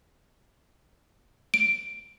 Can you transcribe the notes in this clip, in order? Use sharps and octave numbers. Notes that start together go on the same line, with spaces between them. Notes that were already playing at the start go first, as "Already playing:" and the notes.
D7